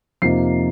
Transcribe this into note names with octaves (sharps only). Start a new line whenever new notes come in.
F2 C3 F3 A#3 D#4 C7